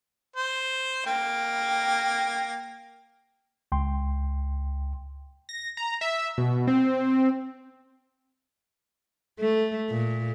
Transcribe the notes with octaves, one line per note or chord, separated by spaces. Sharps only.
C5
A#3 G5
C#2 G5 C6
A#6
A#5
E5
B2
C4
A3
A#2